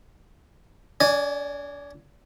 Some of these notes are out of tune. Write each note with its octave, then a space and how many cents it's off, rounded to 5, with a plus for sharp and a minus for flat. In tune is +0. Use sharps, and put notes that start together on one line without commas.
D4 -40 D5 +25 G#5 +0